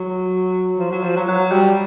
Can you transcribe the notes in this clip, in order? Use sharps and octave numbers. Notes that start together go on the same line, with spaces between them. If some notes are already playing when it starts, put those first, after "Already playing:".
Already playing: F#3
F3
F#3
F3
F#3
F#3
G3